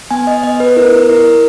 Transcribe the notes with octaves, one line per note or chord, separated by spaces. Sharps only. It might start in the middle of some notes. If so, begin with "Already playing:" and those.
B3 G#5
D#5
B3 D#5
B4
E4 A#4
E4 A#4